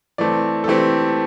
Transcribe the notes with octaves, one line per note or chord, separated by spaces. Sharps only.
E3 A3 C4 D5
A4
E3 A3 C4 G4